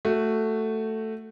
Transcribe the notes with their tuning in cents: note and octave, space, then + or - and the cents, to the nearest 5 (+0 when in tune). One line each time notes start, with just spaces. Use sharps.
A3 +5 F#4 +0